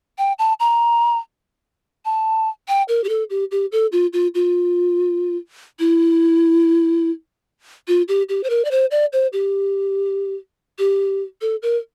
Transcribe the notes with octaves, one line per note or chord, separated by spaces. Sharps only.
G5
A5
A#5
A5
G5
A#4
G4
A4
G4
G4
A4
F4
F4
F4
E4
F4
G4
G4
C5
A#4
D5
C5
D5
C5
G4
G4
A4
A#4